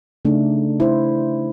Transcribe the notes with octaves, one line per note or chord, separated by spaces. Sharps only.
C#3 A3 D4 D#4
E4 C5